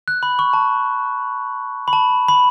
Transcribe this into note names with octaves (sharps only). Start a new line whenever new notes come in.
F#6
B5
C#6
A5
B5
A5
B5